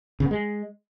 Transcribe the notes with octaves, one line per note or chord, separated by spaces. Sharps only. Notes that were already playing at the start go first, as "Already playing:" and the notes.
C#3
B3
G#3